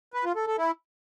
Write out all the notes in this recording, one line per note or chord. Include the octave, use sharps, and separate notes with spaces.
B4
F4
A4
A4
E4